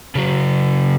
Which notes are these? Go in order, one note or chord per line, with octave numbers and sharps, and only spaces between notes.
C#3 F#3